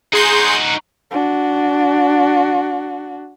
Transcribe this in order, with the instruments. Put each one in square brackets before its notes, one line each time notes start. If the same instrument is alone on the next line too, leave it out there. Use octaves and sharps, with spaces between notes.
[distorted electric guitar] D#4 F#4 [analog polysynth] G#4 C6 G6
[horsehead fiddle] D4 F#4